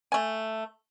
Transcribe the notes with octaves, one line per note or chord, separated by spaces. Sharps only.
A3 G#5